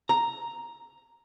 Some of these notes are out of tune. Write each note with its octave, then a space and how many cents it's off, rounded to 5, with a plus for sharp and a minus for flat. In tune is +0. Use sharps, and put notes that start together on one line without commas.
A#5 +0